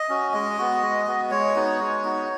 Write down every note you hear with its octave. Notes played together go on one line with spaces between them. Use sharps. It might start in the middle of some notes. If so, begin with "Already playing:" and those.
Already playing: D#5
C#4 F#4
G#3 D#5
B3 F#4
G#3
B3 F#4
G#3 C#5
B3 D#4 F#4
G#3
B3 D#4 F#4